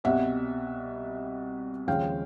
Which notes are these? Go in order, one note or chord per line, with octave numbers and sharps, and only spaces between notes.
C2 B2 G3 E5 F#5
D#2 C#3 F3 G#3 F5 G5